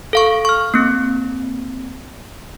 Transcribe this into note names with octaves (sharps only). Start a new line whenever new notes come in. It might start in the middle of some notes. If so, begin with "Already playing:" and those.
A4 F5 C#6
C#6 F6
A#3 C4